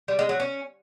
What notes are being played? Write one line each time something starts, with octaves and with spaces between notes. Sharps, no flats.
G3
G#3
F#3
C#4